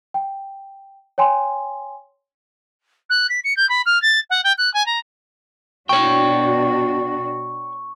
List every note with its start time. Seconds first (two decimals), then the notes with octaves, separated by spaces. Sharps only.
0.14 G5
1.18 C#5 G5 G#5 C6
3.10 F#6
3.29 B6
3.44 C#7
3.57 G6
3.69 B5
3.86 F6
4.02 A6
4.30 F#5
4.44 G5
4.58 F#6
4.74 G#5
4.86 A#5
5.89 B2 D4 F#4 C#5 G5 C#6